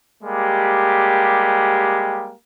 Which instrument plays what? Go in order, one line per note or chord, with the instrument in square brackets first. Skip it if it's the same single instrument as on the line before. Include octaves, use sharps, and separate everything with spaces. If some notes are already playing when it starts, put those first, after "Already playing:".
[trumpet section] G3 G#3 A#3 G4